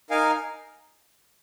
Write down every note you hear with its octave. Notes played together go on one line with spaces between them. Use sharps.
D#4 A#4 F5 G#5